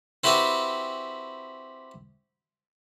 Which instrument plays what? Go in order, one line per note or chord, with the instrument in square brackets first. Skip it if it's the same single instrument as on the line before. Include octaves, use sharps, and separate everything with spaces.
[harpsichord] C4 E4 F#4 G4 B4